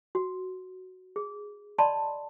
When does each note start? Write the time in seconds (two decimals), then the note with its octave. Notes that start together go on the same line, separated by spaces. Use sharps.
0.15 F#4
1.16 G#4
1.78 D5 D#5 A5 B5 C6